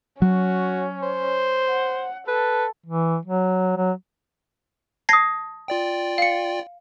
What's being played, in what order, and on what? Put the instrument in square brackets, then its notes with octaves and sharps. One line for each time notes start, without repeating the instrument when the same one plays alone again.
[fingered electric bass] F#3 [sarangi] C#4 [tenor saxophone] F#4
[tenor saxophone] C5
[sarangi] F#5
[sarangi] A4 [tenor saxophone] B4
[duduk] E3
F#3
F#3
[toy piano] A5 D#6 [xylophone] G#6 A#6 C7
[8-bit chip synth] F4 D5 G5
[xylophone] F5 C#7